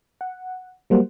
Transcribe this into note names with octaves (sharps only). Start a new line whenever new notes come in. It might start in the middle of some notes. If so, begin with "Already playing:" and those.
F#5
F#3 G3 A#3 C5 F#5